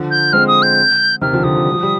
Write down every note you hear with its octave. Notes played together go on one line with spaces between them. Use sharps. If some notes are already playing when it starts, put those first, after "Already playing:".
Already playing: D3 F3
G6
G#3 C4 F6
D#6
G6
C3 D#3 F6
D3 F3
D3 F3 D#6
F3
G3
F3
G3